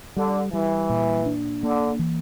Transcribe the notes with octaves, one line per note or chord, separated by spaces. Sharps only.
D3 G3
E3 G3
A#2
D4
D3 A#3
E3